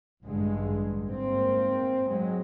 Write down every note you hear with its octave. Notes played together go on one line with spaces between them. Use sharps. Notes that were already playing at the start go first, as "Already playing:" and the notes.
A1 G2 D3 G#3
G#2 A#3 C4
F#3 G#3